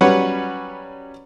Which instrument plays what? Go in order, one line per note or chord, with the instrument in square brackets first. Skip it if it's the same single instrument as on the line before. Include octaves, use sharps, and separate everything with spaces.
[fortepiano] F#3 G3 C#4 B4 C#5 F#5